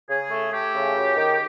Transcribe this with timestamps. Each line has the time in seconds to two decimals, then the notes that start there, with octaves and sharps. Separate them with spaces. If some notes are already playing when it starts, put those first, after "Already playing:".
0.10 C#3 G#4
0.31 A3
0.52 A3 G4
0.74 C#3
0.96 F#2
1.17 D#3